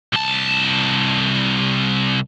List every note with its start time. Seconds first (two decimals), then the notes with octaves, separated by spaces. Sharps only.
0.13 C2 A5